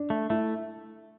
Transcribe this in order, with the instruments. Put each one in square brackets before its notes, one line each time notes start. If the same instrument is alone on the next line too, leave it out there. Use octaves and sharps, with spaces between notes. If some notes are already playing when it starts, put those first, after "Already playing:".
Already playing: [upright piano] D4
[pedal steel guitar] A3
[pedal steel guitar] A3 [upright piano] E4